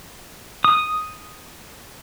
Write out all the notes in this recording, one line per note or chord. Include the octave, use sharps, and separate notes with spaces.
D#6